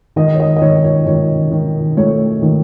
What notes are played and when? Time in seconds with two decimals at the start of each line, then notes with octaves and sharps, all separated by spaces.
0.16 D#3 D#5
0.35 C#5
0.40 D#5
0.57 D#5
0.61 D#3 C#5
0.84 C#5
1.07 D#3 C#5
1.51 D#3
1.97 A3 C#5
2.42 D#3